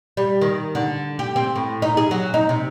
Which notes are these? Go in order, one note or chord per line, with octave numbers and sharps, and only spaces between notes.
G3
D#3
D3
G4
C4
A2
D#4
G#4
F#3
D#4
C3